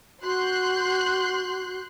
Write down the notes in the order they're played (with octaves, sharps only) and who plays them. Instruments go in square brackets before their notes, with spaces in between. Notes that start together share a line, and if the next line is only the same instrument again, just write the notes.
[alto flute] F#4 [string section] C6 F#6 G6